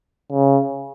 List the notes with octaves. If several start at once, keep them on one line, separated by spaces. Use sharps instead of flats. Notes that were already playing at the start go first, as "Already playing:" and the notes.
C#3